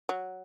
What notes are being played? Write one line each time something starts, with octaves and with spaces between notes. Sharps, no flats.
F#3